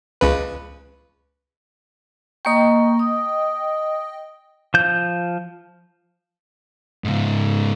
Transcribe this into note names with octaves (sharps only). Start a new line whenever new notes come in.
C#2 C#3 B4
A#3 D#5 G5 C#6
D#6
F3 G6
G#2 C#3